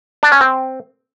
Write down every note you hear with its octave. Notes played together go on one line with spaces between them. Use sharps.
D4
C#4
C4